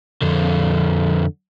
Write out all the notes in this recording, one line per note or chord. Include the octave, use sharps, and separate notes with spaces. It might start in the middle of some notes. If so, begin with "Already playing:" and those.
F2 D3